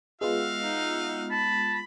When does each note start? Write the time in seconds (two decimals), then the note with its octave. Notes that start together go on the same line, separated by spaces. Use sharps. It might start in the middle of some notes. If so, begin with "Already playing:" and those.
0.21 G#3 B3 F4 F#4 E5 F5
0.62 D#4
1.31 A5 B5